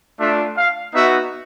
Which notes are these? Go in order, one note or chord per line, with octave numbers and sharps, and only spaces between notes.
A3 D4 F4 E5
F5
B3 D#4 F#4 E5